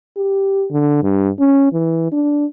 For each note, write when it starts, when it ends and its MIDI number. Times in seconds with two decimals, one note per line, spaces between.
0.17 0.65 67
0.71 1.02 50
1.03 1.29 43
1.40 1.70 61
1.73 2.07 52
2.12 2.46 62